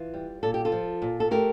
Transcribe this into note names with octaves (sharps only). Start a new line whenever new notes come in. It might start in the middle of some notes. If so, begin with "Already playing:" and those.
Already playing: E3 F4
G3
A#2 A4
G4
F4 A4
F3
A#2
A4
A3 G4 A#4